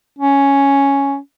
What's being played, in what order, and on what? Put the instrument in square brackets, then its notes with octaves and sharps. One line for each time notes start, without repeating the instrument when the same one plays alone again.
[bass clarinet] C#4